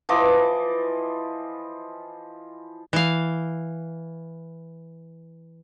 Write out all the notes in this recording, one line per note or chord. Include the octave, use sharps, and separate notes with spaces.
E3 F3 D#5 D6
E3 F5